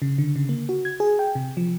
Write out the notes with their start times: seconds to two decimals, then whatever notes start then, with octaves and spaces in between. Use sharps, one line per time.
0.02 C#3
0.18 D3
0.36 C#3
0.49 A#3
0.69 F#4
0.85 G#6
1.00 G#4
1.19 G5
1.35 C3
1.57 F3